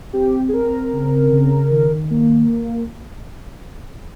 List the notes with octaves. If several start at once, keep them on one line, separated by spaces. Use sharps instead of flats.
C4 G4
G#4
C4 A#4
C#3
C#3
D#3
A#3